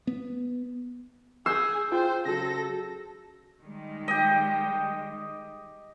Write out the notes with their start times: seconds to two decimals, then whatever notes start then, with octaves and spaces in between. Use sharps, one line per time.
0.07 B3
1.46 G#4 E6 G6 C7
1.92 F4 C5 G5
2.25 C#3 F#3 A4 A#6
3.61 D#3 G3 G#3
4.08 G4 D#5